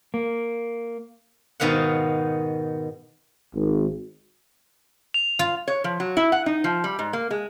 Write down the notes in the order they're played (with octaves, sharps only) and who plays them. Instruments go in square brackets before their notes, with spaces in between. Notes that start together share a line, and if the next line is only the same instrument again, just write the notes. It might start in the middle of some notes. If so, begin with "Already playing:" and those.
[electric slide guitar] A#3
[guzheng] G#2 B2 D#3 B3 F5 F#5
[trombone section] G#1
[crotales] F7
[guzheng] F4
[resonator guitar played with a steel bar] C#5
F3
F#3
E4
F#5
D#4
F3
G3
G#2
A#3
G#3